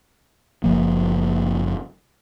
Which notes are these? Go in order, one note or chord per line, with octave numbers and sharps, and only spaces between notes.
F#1 F3 A#3